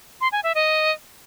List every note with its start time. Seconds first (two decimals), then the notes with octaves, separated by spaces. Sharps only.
0.21 C6
0.32 G#5
0.44 E5
0.55 D#5